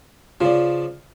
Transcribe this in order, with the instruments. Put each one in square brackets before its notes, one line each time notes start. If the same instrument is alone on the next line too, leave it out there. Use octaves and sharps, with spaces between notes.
[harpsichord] C#3 F3 [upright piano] F4 D5